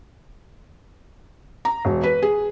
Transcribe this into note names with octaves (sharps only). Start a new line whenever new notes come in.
A#5
E1
B4
G#4